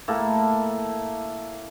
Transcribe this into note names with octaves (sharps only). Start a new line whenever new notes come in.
A2 A#3 A4